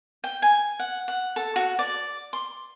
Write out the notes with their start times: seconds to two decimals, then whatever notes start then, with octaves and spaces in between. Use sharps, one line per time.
0.24 G5
0.42 G#5
0.80 F#5
1.08 F#5
1.36 A4
1.56 F#4
1.79 D5
2.33 C6